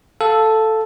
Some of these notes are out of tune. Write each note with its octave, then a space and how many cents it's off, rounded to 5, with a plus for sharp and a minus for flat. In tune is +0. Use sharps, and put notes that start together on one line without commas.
A4 +0 F5 +0